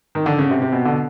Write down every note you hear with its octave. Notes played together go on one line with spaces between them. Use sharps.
D#3
D3
C#3
C3
C3
B2
D3